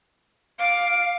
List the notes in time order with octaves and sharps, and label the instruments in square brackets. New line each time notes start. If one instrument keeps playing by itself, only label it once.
[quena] F5 [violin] D6 D7